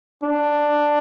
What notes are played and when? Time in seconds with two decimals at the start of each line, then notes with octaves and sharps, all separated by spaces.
0.23 D4